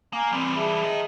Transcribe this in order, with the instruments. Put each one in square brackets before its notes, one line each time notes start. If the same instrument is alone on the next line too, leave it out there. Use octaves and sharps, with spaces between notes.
[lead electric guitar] A#3 [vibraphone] G#5 A#5
[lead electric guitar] E3 G3 [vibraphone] C4
[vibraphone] G#4 E5 A5
[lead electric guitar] A#4 D#5